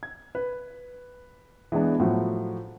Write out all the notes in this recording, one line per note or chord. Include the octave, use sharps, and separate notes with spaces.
G#6
B4
E3 G#3 B3 D4
A2 F3 F#3 F4 F#4